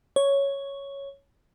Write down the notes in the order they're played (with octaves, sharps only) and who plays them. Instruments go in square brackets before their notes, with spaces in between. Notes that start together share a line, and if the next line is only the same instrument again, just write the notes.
[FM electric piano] C#5